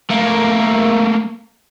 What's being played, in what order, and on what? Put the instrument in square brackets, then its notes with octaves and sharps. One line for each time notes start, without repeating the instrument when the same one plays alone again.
[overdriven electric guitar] A3 A#3